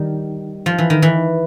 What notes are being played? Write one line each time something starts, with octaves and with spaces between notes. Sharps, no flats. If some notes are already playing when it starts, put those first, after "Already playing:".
Already playing: D#3 G3
F3
E3
D#3
E3